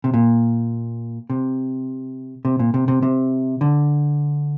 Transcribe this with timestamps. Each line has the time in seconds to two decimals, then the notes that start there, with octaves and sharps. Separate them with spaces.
0.04 C3
0.14 A#2
1.30 C3
2.45 C3
2.59 A#2
2.74 C3
2.88 C3
3.03 C3
3.61 D3